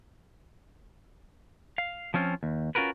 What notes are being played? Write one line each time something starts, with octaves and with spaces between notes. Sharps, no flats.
F5
F3 C4 C#4 F4
D#2
C#4 F4 F#4 A#4 B4